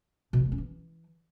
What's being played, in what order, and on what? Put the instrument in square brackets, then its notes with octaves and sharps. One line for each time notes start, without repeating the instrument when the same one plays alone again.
[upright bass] B2
E3
G#3
C#4
E3